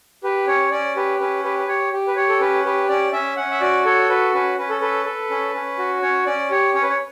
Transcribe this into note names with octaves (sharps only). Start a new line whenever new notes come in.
G4 B4
C#4 C#5
C#4 D5
G4 B4
C#4 B4
G4 B4
B4
G4 C#5
G4
B4
G4 C#5
A4
C#4 B4
G4 B4
C#4 D5
C#4 E5
C#4 F#5
E5
F#4 D5
A4 C#5
F#4 B4
C#4 B4
C#4 B4
A4
A4 B4
A4
C#4
C#4
F#4
C#4 C#5
C#4 D5
G4 C#5
C#4 C#5
B4
C#5